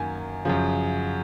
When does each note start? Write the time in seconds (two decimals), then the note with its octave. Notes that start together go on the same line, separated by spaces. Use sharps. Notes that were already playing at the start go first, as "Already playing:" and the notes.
Already playing: F#2 D#3 A#3 G#5
0.45 F#2 C#3 F3